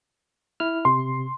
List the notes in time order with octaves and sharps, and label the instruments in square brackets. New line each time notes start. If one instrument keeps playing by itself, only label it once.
[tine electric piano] E4 F6
[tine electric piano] C3 [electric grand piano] C6